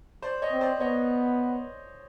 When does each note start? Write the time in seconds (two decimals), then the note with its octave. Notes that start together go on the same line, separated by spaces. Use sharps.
0.22 C5 D5
0.42 C#5 D#5
0.51 C4
0.61 C5 D5
0.80 B3 C#5 D#5